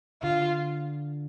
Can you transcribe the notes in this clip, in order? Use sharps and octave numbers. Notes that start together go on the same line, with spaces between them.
D3 F4